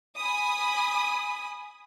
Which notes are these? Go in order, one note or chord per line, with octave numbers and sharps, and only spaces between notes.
G#5 B5 D#6